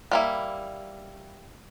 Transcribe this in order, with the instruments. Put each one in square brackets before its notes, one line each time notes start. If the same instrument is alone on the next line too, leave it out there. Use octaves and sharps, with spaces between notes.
[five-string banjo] G3 A#3 E4